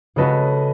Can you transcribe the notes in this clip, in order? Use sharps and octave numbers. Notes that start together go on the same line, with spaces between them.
C#3 G#3 C#4 F#4 A4 B4 D#5